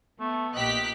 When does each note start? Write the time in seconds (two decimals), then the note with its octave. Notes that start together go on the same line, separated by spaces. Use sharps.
0.20 A3 B3
0.55 A#1 A#2 G4 D#5 F#6 B6